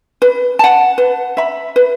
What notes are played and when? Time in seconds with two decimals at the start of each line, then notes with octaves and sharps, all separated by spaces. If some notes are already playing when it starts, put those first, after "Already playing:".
0.22 B4
0.59 F#5 A5
0.98 B4
1.37 E5 B5
1.76 B4